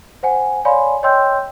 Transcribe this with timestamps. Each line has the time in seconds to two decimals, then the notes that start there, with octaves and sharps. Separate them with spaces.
0.23 C5 F#5 G#5
0.65 C#5 D5 F5 G#5 B5 C6
1.03 C#5 D#5 G5 C6 E6 G6